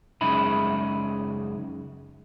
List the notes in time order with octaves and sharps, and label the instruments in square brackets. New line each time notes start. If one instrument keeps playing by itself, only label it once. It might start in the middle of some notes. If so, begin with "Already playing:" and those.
[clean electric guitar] F#2 C#3 G#3 D#4 E5 B5